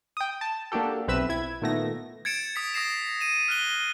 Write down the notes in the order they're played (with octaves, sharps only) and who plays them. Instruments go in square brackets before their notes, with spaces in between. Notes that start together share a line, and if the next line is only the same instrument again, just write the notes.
[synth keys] G5 D#6
A5
A#3 D4 F#4 G4 A4
B1 C4 B4 E5 E6 E7
E4 G#6
A#2 D#3 A3 B3 A#6
[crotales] G#6 A6 C#7 D7 E7
D#6 B6
D#6 A#6 C7 E7
D#7 E7
F6 F#6 G7